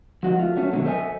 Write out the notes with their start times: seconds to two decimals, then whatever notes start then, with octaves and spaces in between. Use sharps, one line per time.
0.23 F3 F#4 D#5
0.39 A3 F4
0.56 F#3 A3 C#4
0.72 B2 D3 D#3 F#3 A3
0.85 A4 C5 D#5 E5 G#5